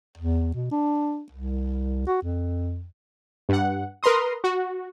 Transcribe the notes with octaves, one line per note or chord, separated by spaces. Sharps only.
E2
B2
D4
C2
F#4
F2
G2 F#5
A#4 B4 A#5 C6 D#6
F#4